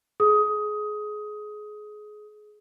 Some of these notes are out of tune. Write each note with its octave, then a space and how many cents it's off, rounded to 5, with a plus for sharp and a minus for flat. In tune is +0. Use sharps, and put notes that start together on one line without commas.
G#4 +25 D#6 +15